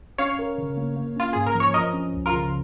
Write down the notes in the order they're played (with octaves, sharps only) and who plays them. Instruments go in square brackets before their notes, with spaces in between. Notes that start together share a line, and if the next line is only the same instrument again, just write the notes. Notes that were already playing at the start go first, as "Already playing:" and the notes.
[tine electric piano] C#4 [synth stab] C#5 F5
[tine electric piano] A#4
C#3
A#3
A#3
[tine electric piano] C#4 [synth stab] F4
[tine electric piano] G#2 [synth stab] G#4
[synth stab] A#4
[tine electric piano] F3
[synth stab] C#5
[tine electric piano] F3 [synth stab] A#4 D#5
[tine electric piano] C#4
C#2
[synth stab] F4 A#4
[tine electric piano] C#3